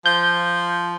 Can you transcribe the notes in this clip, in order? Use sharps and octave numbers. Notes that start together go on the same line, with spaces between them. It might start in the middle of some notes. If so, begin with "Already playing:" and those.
F3 G6